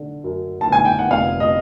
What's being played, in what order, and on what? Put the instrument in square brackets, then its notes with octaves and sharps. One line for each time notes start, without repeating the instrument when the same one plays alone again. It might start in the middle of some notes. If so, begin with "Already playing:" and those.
Already playing: [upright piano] D3
F#2
A5
G1 G#5
G5
F#5
F1 F5
D#5